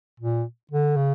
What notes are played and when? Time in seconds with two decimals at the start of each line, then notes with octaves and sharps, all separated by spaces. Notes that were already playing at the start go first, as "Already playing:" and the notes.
0.20 A#2
0.71 D3
0.96 C#3